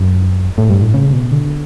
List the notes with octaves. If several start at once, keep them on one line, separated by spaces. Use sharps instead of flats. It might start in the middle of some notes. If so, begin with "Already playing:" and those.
Already playing: F#2
A2
G2
A2
C#3
B2
D3